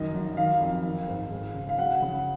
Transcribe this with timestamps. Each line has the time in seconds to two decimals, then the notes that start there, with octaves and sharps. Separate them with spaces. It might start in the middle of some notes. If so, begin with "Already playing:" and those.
Already playing: F#2 D#3 D#5
0.14 F#2
0.37 D#3 F5
0.60 F2
0.84 D#3
1.08 G#2
1.31 G#3
1.54 C#3
1.69 F5
1.78 F#3 F#5
2.02 C#3